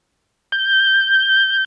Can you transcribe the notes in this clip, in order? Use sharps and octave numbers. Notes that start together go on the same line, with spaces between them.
G6